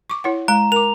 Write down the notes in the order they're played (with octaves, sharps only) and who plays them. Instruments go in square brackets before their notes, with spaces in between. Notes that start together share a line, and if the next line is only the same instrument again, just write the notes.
[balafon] C#6 D6
E4 C#5 F#5
[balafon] G#3 [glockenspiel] A#5
[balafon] A#4 D6 [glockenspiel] F7